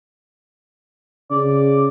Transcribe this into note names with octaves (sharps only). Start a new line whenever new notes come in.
C#3 D5